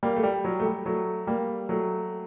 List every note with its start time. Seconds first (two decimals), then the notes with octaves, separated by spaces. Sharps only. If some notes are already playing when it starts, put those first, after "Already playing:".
0.03 G3 A#3
0.16 A3
0.23 G3
0.45 F#3
0.60 A3
0.65 G3
0.86 F#3 A3
1.27 G3 A#3
1.69 F#3 A3